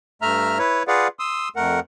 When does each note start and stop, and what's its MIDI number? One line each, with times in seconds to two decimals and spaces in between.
0.22 0.58 43
0.22 0.58 57
0.22 0.58 76
0.22 0.58 82
0.22 0.58 89
0.59 0.83 64
0.59 0.83 71
0.59 0.83 73
0.88 1.08 65
0.88 1.08 68
0.88 1.08 71
0.88 1.08 74
0.88 1.08 77
0.88 1.08 78
1.19 1.49 84
1.19 1.49 87
1.19 1.49 88
1.56 1.80 41
1.56 1.80 57
1.56 1.80 70
1.56 1.80 78